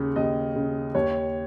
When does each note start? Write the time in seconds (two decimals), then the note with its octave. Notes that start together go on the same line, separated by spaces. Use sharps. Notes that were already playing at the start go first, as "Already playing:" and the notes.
Already playing: D#2 C#3
0.16 D#2 D#5
0.56 C#3
0.95 D#2 C#5